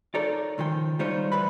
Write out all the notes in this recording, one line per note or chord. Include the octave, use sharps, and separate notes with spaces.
D#4 A4 A#4 C#5 D5
C#2 D#3 F3 G5
G3 G#3 D#4 F4 C5 C#5
D2 E3 G3 B4 B5